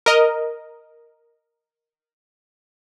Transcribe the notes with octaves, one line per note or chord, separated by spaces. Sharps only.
A#4 D#5